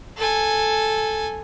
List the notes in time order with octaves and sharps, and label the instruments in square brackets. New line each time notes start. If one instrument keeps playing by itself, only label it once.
[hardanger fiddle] A4 G#5